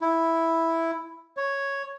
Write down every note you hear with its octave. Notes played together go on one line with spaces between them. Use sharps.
E4
C#5